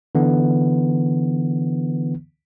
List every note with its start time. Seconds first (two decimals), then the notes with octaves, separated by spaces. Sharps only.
0.15 D3 E3 B3